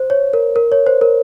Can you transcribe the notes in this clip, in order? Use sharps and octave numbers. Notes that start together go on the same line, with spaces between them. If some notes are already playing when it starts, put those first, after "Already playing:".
Already playing: C5
C#5
A#4
A#4
C#5
C5
A#4